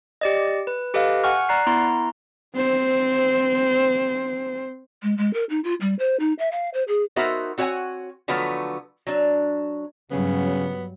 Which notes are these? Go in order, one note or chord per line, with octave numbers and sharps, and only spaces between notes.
G4 D5 D#5
B4
G4 A4 B4 D#5 F5
F#5 G#5 C#6 F6
D5 A#5 F#6 C7
B3 E4 A#5 C6
C4 C5
G#3
G#3
A#4
D#4
F4
G3
C5
D#4
E5
F5
C5
G#4
B3 D#4 F#4 A#4 C5 E5
C4 F#4 C#5 D5 F#5 G#5
D3 F3 F#3 A3 B3
F#3 D4
G2 C#3 F#3 G3 B3